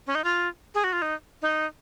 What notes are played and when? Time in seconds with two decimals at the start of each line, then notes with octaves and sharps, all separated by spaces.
0.07 C#4
0.15 D#4
0.24 F4
0.75 G#4
0.84 F#4
0.93 F4
1.02 D#4
1.42 D#4